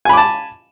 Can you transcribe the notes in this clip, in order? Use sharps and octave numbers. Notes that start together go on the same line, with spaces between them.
G#5 A5 B5 D6